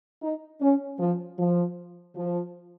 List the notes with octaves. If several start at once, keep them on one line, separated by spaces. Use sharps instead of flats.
D#4
C#4
F3
F3
F3